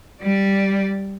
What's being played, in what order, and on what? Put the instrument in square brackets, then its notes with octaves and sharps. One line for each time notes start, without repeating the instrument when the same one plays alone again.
[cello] G3 D5